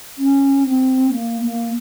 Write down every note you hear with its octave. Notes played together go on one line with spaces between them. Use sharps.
C#4
C4
A#3
A#3